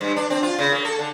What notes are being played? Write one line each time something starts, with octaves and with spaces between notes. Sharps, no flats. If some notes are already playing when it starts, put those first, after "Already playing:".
G2
D4
C4
F4
C#3
A#3
A4
D3